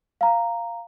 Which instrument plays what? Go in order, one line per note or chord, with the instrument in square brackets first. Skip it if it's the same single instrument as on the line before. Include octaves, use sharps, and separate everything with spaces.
[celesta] F5 A#5